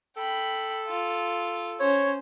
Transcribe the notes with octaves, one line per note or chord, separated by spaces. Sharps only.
A4 G5 B5
F4
C#4 C5 C#5